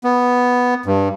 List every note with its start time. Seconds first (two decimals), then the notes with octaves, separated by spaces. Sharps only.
0.04 B3
0.86 G2